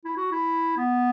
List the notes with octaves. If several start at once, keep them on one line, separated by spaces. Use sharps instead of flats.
E4
F#4
E4
B3